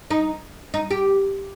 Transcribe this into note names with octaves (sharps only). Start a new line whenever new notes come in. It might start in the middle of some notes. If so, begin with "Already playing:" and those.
D#4
D#4
G4